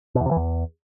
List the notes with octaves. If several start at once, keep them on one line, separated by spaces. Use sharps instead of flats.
B2
E2
C3
E3
E2